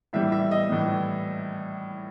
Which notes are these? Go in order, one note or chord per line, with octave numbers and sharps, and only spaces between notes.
A2 E3 G3 E5
E5
D#5
A2 E3 G3